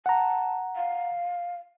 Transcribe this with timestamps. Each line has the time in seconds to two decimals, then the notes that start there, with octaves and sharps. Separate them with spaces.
0.06 F#5 A5 A#5
0.76 F5